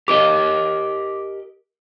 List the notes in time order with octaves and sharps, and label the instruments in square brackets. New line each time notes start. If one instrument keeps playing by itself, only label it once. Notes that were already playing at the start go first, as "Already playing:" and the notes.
[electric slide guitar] G4 A#4 D#5 [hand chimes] D6